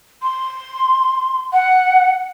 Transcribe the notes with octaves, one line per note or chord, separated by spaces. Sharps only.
C6
F#5